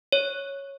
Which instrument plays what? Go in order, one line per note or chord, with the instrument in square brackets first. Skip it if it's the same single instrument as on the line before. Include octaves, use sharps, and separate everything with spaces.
[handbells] C#5